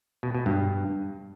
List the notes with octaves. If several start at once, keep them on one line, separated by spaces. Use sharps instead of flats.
B2
B2
G2